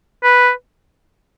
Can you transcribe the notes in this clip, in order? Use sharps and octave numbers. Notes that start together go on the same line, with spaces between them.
B4